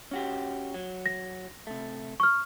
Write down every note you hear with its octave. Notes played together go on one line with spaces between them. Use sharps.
C#4 F#4 G4
F#3
A#6
C3 A3
C#6 F6